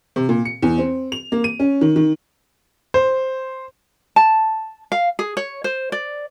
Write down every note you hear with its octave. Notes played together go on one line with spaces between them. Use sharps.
C3
A#2
C#7
E2
C4
F7
A#3
D#7
C#4
D#3
D#3
C5
A5
F5
G#4
C#5
C5
D5